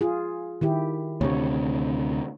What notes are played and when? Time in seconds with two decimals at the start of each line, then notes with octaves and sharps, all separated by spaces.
0.01 F4 G#4
0.61 D#3 E4 G4
1.21 D2 C3 C#5